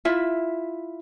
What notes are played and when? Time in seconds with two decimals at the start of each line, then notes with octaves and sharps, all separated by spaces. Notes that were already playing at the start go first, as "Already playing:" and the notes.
0.05 E4 F4 E5